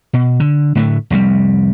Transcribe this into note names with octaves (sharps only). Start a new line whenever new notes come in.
B2
D3
A2 D3 A3
F1 C2 C3 G3